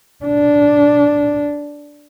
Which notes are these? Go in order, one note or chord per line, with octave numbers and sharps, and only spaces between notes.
D4